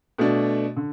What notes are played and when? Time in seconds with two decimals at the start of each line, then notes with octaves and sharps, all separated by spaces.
0.18 B2 A3 D4
0.77 D3